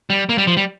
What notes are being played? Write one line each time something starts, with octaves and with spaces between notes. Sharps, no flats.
G3
A#3
G3
F3
G3